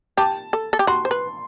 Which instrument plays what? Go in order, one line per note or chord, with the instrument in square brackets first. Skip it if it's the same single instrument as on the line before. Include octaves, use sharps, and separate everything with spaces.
[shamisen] G4 [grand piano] A5
[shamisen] A4
A4
G4
[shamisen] F#4 [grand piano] C6
[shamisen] C5
B4